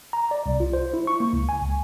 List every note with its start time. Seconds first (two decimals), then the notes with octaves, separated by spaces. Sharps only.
0.13 A#5
0.31 D5
0.46 C2
0.60 F4
0.73 C5
0.94 E4
1.07 C#6
1.20 A#3
1.33 C#2
1.49 G#5
1.62 C#2